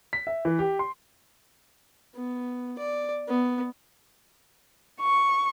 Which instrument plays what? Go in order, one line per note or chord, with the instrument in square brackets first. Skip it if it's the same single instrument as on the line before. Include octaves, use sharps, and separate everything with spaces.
[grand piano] B6
E5
E3
G4
C6
[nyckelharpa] B3
D5
B3
[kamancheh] C#6